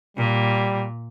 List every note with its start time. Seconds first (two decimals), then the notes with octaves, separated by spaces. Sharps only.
0.17 A#2 G3